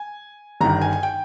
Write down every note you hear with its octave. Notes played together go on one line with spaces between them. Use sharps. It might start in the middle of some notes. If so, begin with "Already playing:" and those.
Already playing: G#5
G1 G2 D#3 A#5
G#5
G#5
G5